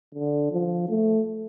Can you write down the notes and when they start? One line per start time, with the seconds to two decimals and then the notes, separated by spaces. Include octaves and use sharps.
0.15 D3
0.52 F3
0.89 A3